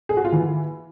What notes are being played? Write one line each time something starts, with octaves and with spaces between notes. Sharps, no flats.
G#4
F#4
F4
E3